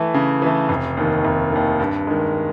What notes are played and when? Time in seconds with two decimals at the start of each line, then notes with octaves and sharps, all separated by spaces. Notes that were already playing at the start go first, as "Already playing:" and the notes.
Already playing: E3 A3
0.14 C#3
0.42 E3 A3
0.69 F1
0.97 D#2 D#3
1.25 F1
1.52 D#2 D#3
1.79 G2
2.07 D#3 G#3